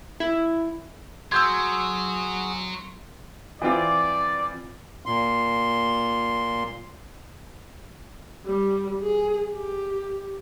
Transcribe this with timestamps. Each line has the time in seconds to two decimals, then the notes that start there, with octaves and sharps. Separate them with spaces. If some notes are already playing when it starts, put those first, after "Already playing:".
0.20 E4
1.32 F#3 F#4 G#4 C6 E6 G6 G#6
3.61 E3 C4 F4 D5
5.06 A#2 C6
8.46 G3
9.02 G#4
9.54 G4